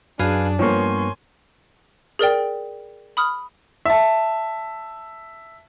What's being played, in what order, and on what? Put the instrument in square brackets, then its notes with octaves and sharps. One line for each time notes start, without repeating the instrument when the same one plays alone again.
[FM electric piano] F#2 F#3 [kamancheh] D4 G#4 [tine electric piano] B4 F5 G#5
[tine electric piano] G2 B3 [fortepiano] F3 A#3 [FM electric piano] C#5 C#6 [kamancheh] G#5 C6
[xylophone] G#4 A#4 D5 G5
B5 D#6 F6
[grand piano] E5 A5